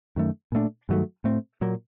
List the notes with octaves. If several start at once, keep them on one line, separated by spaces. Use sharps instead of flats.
F#2 D#3 A3
A#2 A3 D4
G2 D#3 F#3 A3
A2 A3 C4
A#2 F#3 A#3